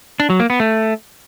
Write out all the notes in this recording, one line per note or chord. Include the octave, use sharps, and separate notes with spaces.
D4
F#3
A#3
B3
A3